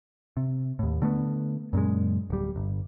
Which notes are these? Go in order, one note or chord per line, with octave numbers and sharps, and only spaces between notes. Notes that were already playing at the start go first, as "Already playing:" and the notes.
C3
D#2 A2
D3 A3 B3
F#2 A#2 C#3 G#3
D1 G3
G1